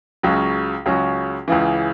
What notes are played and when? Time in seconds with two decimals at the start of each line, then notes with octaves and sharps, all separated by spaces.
0.23 C#2 C#3 F#3 C#4 F#4
0.86 C#2 C#3 F#3 C#4 F#4
1.48 C#2 C#3 E3